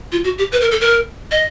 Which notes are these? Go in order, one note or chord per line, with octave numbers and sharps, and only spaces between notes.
F4
F#4
G4
B4
A#4
A4
A#4
D#5